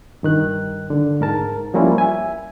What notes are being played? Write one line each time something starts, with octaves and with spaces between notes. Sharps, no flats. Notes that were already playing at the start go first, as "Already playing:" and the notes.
G2 D#3 F#6
D3
G#2 A#4 A5
F3 G3 A#3 C#4 E4 F4
E5 G#5